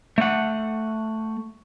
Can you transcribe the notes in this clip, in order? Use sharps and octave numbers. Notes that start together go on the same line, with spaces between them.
A3 F#5